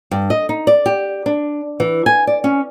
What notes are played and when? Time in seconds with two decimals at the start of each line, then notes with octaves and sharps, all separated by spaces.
0.11 G2
0.30 D#5
0.49 D#4
0.67 D5
0.86 G4
1.26 D4
1.80 E3
2.06 G#5
2.27 D5
2.44 C#4